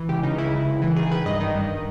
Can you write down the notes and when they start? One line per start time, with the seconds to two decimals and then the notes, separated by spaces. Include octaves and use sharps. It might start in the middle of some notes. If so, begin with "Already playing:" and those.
Already playing: E3
0.09 C#2 G4
0.23 C#3 D#4
0.38 C#3 E4
0.53 C#2
0.67 C#2
0.82 E3
0.96 D#3 G#4
1.11 D#3 B4
1.26 G2 D#5
1.40 D#3
1.55 G2